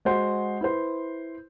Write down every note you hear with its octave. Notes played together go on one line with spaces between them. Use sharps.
G#3 F#4 C5 F#5
E4 B4 C5